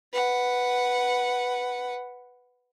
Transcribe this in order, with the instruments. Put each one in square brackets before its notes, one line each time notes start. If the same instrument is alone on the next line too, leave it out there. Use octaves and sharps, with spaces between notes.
[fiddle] B4 F#5